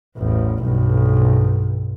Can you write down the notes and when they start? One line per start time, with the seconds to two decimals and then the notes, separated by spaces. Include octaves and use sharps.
0.18 A1 E2
0.62 B1 G2